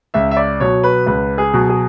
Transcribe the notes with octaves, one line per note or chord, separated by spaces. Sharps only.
C#2 E5
E5
D5
B2 F#3 C#5
B4
C#2 B4
G#4
B2 F#3
G#4